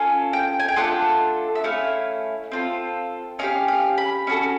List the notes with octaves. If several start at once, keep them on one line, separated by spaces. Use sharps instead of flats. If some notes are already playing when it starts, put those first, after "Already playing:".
Already playing: C#4 F4 A4 G#5
G5
G#5
G5
A3 D4 F4 A4 F#5
E5
A3 C#4 E4 F5
C4 F4 A4
C#4 E4 G4 F5
F5
B5
C#4 F#4 A4